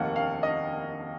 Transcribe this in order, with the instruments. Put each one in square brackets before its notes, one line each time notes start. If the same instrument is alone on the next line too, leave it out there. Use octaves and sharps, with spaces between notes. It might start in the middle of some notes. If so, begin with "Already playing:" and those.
Already playing: [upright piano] F1 D#2 D#3 A#3 F#5
F5
D#5